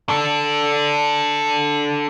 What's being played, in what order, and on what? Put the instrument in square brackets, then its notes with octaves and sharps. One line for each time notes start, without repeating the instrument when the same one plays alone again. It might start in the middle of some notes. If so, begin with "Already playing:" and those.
[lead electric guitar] D4 A4